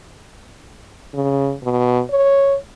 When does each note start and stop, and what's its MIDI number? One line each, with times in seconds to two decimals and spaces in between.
1.14 1.54 49
1.63 2.01 47
2.10 2.56 73